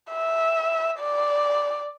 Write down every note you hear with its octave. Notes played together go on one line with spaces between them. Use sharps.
E5
D5